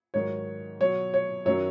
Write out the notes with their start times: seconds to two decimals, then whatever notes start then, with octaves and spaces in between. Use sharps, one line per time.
0.14 G#2 D#3 F#3 C#5
0.80 B2 F#3 C#5
1.14 C#5
1.45 F#2 D#3 F#3 C#5